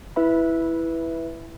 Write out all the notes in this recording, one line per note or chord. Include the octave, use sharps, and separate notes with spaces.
E4 B4 E5 B5